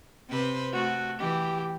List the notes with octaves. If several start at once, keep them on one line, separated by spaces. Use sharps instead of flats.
C3 B4 C5
A3 F#4
E3 G4